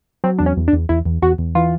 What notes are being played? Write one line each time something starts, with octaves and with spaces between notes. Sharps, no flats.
F#3 C4
E2 D4
C#4
E2
D4
E2
E2 E4
E2
E2 F#4
E2
E3 F4